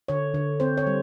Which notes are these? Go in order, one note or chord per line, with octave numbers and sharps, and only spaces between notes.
D3 C#5
D3
C4 C5
C#5
G3